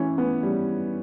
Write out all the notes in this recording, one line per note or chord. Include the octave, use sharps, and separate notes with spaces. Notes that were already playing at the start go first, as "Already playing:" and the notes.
Already playing: E3 C#4
B3
G3